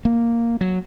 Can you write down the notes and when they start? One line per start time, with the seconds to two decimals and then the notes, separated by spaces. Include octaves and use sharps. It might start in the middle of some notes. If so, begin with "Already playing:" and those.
0.05 A#3
0.61 F#3